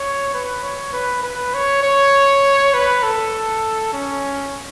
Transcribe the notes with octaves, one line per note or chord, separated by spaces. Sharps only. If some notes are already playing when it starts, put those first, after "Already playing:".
Already playing: C#5
B4
C#5
B4
B4
C#5
C#5
B4
A4
C#4